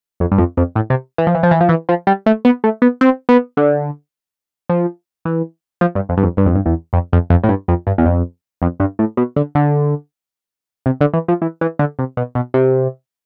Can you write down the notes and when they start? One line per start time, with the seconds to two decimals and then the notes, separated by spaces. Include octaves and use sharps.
0.20 F2
0.31 G2
0.38 F2
0.57 F2
0.76 A2
0.90 C3
1.18 E3
1.27 F3
1.35 E3
1.43 F3
1.51 E3
1.61 F3
1.69 E3
1.89 F3
2.07 G3
2.26 A3
2.45 B3
2.64 A3
2.82 B3
3.01 C4
3.29 B3
3.57 D3
4.69 F3
5.25 E3
5.81 F3
5.95 G2
6.09 F2
6.17 G2
6.23 F2
6.37 G2
6.46 F2
6.55 G2
6.66 E2
6.93 F2
7.13 F2
7.30 F2
7.44 A2
7.49 G2
7.68 F2
7.87 G2
7.98 E2
8.06 F2
8.62 F2
8.80 G2
8.99 A2
9.17 B2
9.36 D3
9.55 D3
10.86 C3
11.01 D3
11.14 E3
11.28 F3
11.42 E3
11.61 E3
11.79 D3
11.99 C3
12.17 B2
12.35 B2
12.54 C3